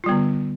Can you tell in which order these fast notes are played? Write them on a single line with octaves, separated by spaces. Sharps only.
F4 G3 B3 D3